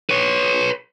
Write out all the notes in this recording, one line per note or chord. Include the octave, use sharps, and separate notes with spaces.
B4 C#5